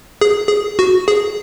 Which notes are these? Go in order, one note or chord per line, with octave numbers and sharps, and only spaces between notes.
G#4
G#4
F#4
G#4